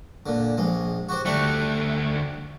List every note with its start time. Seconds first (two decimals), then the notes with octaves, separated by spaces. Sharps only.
0.26 A#2 D3
0.57 A#1 G#3
1.09 F#4 G4 C5
1.26 D2 G3 A3 D4 F#4